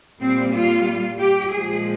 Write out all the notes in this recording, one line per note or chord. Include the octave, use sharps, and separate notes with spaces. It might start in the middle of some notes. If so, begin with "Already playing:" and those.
A#2 G3 C4
F4
G4
A#2 F3 G#3 G#4